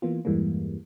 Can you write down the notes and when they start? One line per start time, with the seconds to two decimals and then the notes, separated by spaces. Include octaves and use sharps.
0.02 E3 A#3 B3 F4
0.25 E2 G2 E3 G3 G#3 A#3